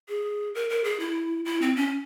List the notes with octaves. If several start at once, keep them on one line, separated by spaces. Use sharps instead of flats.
G#4
A#4
A#4
G#4
E4
E4
C4
C#4